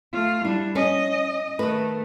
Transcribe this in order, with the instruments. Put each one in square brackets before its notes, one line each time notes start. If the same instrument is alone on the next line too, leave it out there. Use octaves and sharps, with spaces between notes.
[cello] A3 F4
[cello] G3 D4 [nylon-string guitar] E4
[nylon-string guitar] C#4 [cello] D#5
[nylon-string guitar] D#3 B4 [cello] A3